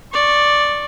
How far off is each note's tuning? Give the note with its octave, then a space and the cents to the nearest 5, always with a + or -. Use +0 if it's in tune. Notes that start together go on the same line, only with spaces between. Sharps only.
D5 +0 C#6 -20